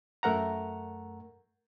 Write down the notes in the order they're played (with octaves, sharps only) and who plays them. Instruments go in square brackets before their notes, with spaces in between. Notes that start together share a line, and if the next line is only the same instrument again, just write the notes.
[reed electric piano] F#2 A3 A#4 F#5 A#5